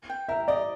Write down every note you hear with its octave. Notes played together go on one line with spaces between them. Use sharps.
G5
A#4 E5
D5 D#5